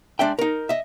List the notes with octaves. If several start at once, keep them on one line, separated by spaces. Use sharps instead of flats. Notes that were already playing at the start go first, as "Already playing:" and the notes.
G#3 D4 D5 E5 G5
D#4 A#4
D#5 E5